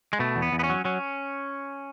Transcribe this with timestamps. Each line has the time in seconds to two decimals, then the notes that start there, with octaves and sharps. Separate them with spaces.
0.13 G#3
0.19 B2 A3
0.36 E2
0.42 B3
0.52 E2
0.59 B3
0.64 C#4
0.70 F#3
0.85 F#3 C#4